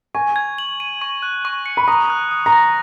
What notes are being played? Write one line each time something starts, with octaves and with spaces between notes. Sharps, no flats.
G#5 C#6
G#6
F#7
D#7
C#6
F#6
C#6
C#7
B5
A#5 D#6
F#6
D#6
A#5
A#6